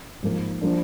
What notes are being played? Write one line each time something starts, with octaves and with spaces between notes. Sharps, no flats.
G#2 F3 A#3
F3 A#3 D4